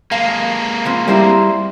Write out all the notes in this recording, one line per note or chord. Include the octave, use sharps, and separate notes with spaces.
G#3 A#3 F5 A5
E3 F3 C4
G3 C4 E4 A#4 C5